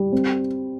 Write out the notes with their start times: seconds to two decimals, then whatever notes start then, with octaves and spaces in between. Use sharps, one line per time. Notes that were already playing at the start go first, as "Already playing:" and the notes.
Already playing: G3
0.12 C4